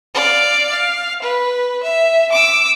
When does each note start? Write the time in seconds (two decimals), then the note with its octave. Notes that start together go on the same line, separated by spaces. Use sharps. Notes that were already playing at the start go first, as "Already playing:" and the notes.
0.14 D5 F5
0.70 F5
1.22 B4
1.84 E5
2.32 D6 E6